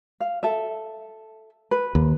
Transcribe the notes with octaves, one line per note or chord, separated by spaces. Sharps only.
F5
A4 E5
B4
D#2